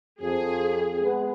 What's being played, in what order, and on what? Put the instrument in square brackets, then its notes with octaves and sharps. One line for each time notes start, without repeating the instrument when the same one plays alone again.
[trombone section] F2 F3 [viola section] G#4
[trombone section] G#3 B3